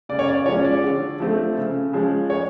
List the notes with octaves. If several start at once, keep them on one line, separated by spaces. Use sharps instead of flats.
C#3 D5
C#5
D5
F3 G#3 C#4 C#5
D5
D3
F3 A3 C4
C#3
F3 G#3 C#4
C#5